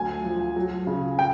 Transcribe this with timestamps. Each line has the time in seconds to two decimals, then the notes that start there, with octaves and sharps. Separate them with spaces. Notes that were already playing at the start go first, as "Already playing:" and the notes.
Already playing: D2 F#3 G#5
0.24 F3
0.56 F#3
0.87 C#3
1.19 G5